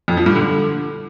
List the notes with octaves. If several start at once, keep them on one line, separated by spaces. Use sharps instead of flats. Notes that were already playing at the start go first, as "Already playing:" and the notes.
F2
F3
G2
D3